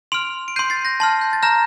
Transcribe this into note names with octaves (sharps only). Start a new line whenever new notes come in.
C6 F6 D7 F7
D7
C6 G6 C7 D#7
A6 C7
G6 A#6
A5 C6 F6
G6
A6
A#5 F6 G6 A#6